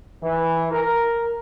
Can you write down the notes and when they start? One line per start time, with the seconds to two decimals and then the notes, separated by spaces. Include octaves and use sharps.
0.23 E3
0.72 A#4